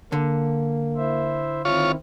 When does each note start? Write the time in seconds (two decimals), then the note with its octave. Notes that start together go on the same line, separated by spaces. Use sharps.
0.12 D3 A#3
0.97 E4 C5 E5
1.65 D#3 C4 E4 F4 C#5